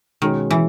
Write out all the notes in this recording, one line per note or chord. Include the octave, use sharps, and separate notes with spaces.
B2 D#3 G#3 C#4 G#4
E3